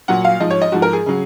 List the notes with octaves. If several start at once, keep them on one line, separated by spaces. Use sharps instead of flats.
A#2 F#3 F#5
F5
G#2 F3 D#5
C#5
D#5
G#2 F3 F#4
A#4
G#4
C#3 F#3